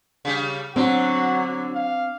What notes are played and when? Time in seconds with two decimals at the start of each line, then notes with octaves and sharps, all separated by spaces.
0.25 C#3 G3
0.76 D3 F#3 C4 F#4
1.76 F5